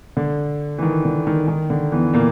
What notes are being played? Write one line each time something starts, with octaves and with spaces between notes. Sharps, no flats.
D3
E3
D#3
D3
D#3
D#3
D3
E2 E3
A#2 A#3